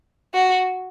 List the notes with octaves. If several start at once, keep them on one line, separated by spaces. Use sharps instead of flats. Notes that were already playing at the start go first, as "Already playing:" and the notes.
F#4